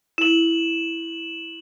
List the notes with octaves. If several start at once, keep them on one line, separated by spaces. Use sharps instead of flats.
E4 E7 F#7